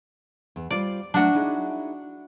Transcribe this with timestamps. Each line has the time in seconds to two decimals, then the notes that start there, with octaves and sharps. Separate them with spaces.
0.56 E2
0.71 G3 F4 C5 D5
1.14 F#3 G#3 A3 D4 F#4
1.35 D#4 E4 G#4